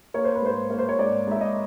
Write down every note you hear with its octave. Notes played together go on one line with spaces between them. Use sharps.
A#3 C#5
C5
B4
G#2 C5
A#3
C5
C#5
G#2 D5
G#2 E5
D#5